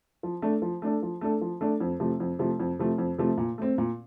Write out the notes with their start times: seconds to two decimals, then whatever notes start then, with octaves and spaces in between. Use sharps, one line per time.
0.23 F3
0.42 A3 D4 A4
0.62 F3
0.82 A3 D4 A4
1.02 F3
1.21 A3 D4 A4
1.41 F3
1.61 A3 D4 A4
1.80 F2
2.00 C3 F3 A3
2.20 F2
2.39 C3 F3 A3
2.60 F2
2.79 C3 F3 A3
2.98 F2
3.18 C3 F3 A3
3.38 A#2
3.58 A3 C4
3.78 A#2